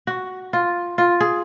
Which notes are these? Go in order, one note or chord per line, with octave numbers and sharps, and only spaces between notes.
F#4
F4
F4
G#4